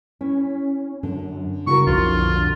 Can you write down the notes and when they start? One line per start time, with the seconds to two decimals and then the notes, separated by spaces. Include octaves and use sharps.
0.21 C#4 E4
1.03 F#2 D3
1.67 C#3 E4 F#4 A#4 C#6
1.87 B1 F2 D3 F4